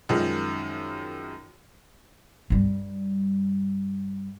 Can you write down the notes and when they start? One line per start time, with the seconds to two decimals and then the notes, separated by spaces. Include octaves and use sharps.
0.09 F#2 D#3 F3 G#3
2.50 G2 G3